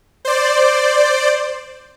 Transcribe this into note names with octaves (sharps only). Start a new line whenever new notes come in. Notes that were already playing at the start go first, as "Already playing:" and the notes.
C5 D5